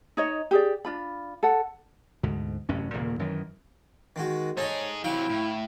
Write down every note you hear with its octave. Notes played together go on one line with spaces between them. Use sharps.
D#4 C#5 D#5
G4 G#4 D5
D4 F4 B5
A4 F#5
D2 G#2 B2
A1 F#2 C3 C#4
D#1 A#2 C#3 A#3
F#2 D#3 E3
D#3 G#3 F#4
D#4 G#4 A4 C#5 D#5
C3 F#3 E4 F5 G5
A2